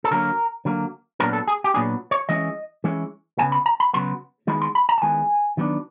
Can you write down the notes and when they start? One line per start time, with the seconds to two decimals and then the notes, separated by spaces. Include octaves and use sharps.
0.04 A4
0.11 D3 F#3 A#3 A#4
0.65 D3 F#3 A#3
1.20 A#2 F#3 B3 D4 A#4
1.33 A4
1.47 G#4
1.64 G4
1.74 A#2 F#3 B3 D4 G#4
2.11 C#5
2.29 E3 G#3 C#4 E4 D#5
2.84 E3 G#3 C#4 E4
3.38 C#3 F#3 B3 G#5
3.52 B5
3.66 A#5
3.80 B5
3.93 C#3 F#3 B3 C6
4.47 D#3 G#3 B3 E4 B5
4.62 C6
4.75 B5
4.89 A#5
4.98 A5
5.02 D#3 G#3 B3 E4 G#5
5.57 D#3 F#3 B3 D4